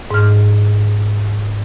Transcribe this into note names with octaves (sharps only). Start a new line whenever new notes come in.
G#2 F6